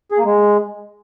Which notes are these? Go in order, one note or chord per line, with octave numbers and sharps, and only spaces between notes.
G#4
A#3
G#3